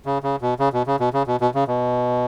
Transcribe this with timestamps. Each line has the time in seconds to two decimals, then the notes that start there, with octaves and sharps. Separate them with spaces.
0.06 C#3
0.23 C#3
0.42 B2
0.59 C#3
0.73 B2
0.87 C#3
1.00 B2
1.13 C#3
1.27 B2
1.41 B2
1.55 C#3
1.68 B2